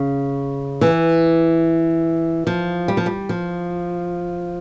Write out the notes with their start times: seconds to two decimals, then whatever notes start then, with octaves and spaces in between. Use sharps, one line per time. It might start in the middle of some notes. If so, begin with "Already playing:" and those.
Already playing: C#3
0.81 E3
2.47 F3
2.88 G3
2.97 F3
3.06 G3
3.29 F3